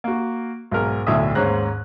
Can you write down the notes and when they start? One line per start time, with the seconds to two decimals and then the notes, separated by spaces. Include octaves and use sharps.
0.04 A#3 F#4
0.71 B1 G#2 A#4
1.06 D1 B1 A2 D3 E5 D#6
1.35 D#2 G#2 C#4 C5 A#5 F#6